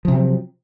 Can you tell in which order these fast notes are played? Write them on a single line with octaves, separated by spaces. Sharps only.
F3 C3 F#3 C4